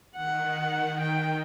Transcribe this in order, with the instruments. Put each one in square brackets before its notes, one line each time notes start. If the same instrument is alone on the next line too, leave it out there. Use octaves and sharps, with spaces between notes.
[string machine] D#3 [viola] F#5
[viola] G5